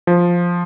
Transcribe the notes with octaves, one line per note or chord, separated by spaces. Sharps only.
F3